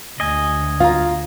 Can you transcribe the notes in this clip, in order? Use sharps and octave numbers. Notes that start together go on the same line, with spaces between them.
D2 D#5 G#5
F4 F5 A#5